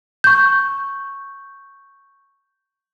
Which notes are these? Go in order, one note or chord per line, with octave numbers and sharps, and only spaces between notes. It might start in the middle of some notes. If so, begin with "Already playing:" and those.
C#6 G6